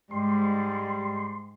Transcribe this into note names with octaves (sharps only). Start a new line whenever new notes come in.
G#2 G3 C6